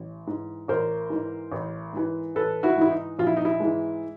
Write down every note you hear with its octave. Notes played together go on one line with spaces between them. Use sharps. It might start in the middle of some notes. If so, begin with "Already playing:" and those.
Already playing: A1
G#2 E3
A1 A#4 C5
G#2 E3
A1
G#2 E3
A1 A4 B4
E4 F#4
G#2 E3 E4
D#4
A#1 F4
E4
D#4
E4
G#2 E3 G#3